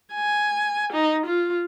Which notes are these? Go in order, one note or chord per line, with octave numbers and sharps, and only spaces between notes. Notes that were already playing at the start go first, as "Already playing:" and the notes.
G#5
D#4
F4